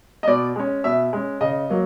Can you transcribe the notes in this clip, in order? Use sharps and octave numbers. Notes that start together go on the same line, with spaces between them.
D#5
B2 D5
G#3 C#4
B2 E5
G#3 C#4
C#3 D#5
F#3 A#3